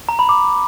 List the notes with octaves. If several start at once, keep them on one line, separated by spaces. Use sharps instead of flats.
A#5
B5
D6